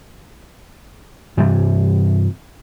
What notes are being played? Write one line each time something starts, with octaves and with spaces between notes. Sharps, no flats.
G2 C3 E3 G3